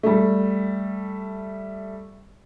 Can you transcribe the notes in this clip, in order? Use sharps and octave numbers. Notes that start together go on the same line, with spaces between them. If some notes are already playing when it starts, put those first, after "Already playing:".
G3 A3